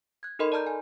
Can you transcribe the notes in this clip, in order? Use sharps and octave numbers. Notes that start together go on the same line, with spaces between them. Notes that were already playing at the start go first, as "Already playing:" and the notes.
F#6 G#6
D#4 A4 A#4 D#5 B5 C6
D5 A5 A#5 F6 G6
G#5